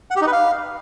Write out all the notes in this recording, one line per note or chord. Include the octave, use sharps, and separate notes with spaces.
F#5
G4
D#4
B4
F5